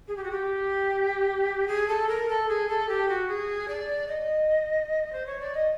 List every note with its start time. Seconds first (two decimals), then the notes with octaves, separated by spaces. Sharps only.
0.08 G#4
0.17 G4
0.24 F#4
0.31 G4
1.68 G#4
1.88 A4
2.08 A#4
2.29 A4
2.48 G#4
2.69 A4
2.89 G4
3.09 F#4
3.28 G#4
3.68 D5
4.08 D#5
5.12 C5
5.26 C#5
5.40 D5
5.54 D#5